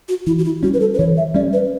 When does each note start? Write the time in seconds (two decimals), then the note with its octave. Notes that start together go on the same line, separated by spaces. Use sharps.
0.09 F#4
0.27 E3 E4
0.39 F#4
0.45 E4
0.63 G3 C#4 F#4
0.74 B4
0.80 A4
0.94 B4
0.98 E3 C#5
1.17 E5
1.34 G3 C#4 D5
1.53 B4